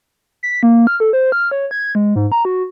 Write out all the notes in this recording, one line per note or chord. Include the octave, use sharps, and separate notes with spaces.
B6
A#3
F6
A4
C5
F6
C#5
G#6
G#3
G#2
A#5
F#4